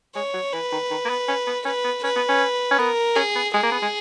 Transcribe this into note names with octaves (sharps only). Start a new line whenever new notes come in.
G#3 C#5
F#3
E3 B4
D#3
D#3
A#3
B3
C#4
B3
C#4 B4
B3
C#4 B4
B3
C#4
C#4
B3 A#4
C#4 G#4
B3
G#3 G#4
A#3
B3
G#3